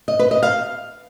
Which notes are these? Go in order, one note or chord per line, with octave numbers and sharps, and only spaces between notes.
D#5
B4
D#5
F5